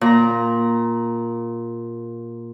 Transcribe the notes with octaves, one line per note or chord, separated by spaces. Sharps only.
A#2 A#5